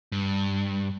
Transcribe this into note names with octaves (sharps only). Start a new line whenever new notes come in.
G2